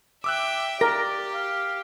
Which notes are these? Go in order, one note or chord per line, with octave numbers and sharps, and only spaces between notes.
E5 G5 D6 E6 F#6
G4 A#4 D5 A#6
F5